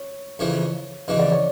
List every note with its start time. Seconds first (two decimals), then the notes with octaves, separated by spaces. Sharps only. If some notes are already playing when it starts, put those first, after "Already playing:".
Already playing: C#5
0.39 F2 C#3 E3
1.08 F2 C#3 E3 D#5
1.19 D5
1.32 C#5